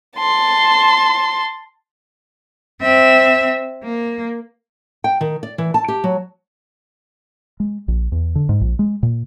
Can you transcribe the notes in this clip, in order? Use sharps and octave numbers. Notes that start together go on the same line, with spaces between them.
A5 C6
C4 E5
A#3
G5
D#3
D5
E3
A5
G4
F#3
G#3
A#1
E2
D3
G#2
A#1
G#3
A#2